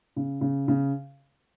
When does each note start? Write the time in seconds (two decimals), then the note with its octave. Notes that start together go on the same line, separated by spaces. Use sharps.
0.16 C#3
0.41 C#3
0.68 C#3